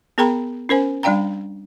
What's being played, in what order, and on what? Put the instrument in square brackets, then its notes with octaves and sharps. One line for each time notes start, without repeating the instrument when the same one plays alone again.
[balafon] B3 G#4 A#4 G5 A#5 B5
C#4 A#4 C5 G#5
G3 D4 D5 F5 G5 A#5